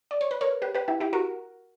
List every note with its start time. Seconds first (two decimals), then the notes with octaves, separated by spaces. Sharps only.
0.11 D5
0.21 C#5
0.31 B4
0.41 A#4 C#5
0.62 G4 B4
0.75 G4 B4
0.88 E4 G4
1.00 E4 G4
1.13 F#4 A#4